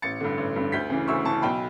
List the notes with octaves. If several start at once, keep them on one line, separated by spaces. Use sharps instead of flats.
A1 A6 C#7
G2 D3
A1
G2 D3
D2 G6 B6
C#3 E3
D2 C#6 E6
C#3 E3 A5 C#6
B1 G5 B5